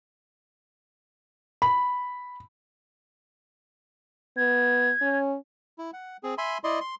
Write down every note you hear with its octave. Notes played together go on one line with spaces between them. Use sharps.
B5
B3 G#6
C#4
E4
F#5
C4 G#4
E5 G#5 B5 C6
E4 D5 D#5 C6
C6